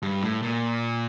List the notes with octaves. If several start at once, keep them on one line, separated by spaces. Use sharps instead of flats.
G2
A2
A#2